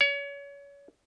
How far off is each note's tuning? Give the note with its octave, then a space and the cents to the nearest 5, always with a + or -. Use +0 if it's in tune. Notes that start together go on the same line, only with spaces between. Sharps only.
C#5 +30